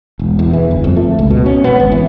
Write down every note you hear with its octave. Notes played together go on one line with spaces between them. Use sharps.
E1
E2
E3
G1
F2
A3
C#2
B2
C#4
B3
G#1
E3